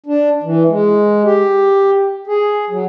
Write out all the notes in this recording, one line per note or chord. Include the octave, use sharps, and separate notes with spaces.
D4
E3
G#3
G4
G#4
F#3